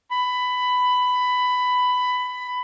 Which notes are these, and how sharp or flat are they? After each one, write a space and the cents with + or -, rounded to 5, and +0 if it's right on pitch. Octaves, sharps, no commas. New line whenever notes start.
B5 +15